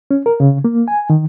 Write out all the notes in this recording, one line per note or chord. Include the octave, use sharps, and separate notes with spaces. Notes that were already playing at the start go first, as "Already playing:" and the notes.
C#4
A#4
C#3
A#3
G#5
D#3